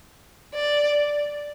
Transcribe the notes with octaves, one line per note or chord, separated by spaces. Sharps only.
D5